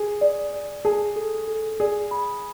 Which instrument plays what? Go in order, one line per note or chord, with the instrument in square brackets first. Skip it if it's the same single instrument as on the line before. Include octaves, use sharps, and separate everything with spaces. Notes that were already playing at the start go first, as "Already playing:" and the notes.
Already playing: [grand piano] G#4
[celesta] D5
D5
[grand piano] G#4 [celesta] A5
[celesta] A4
A4
[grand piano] G#4 [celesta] D5
[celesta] B5